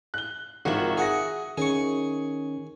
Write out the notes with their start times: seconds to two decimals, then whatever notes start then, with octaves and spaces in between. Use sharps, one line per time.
0.14 F#6 G7
0.65 G#1 D#3 F4 F#4 E5
0.97 G#4 F#5 D#6 A#6
1.58 D#3 C#4 G#4 C#6